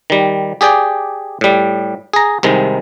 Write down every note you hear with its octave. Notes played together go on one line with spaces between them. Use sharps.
D#3 G3
G4 G#4 D5 G5
A2 G3
G#4 A#5
C2 C3 D#3 G#3